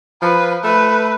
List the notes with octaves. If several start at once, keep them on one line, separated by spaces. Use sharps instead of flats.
F3 B4
A3 B4